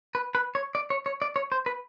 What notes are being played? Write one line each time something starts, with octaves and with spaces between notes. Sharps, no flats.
B4
B4
C#5
D5
C#5
C#5
D5
C#5
C5
B4